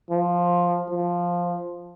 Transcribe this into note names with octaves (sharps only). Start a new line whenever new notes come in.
F3
F3